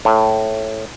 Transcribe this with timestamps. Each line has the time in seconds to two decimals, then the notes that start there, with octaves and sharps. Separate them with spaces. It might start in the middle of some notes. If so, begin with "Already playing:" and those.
0.05 A2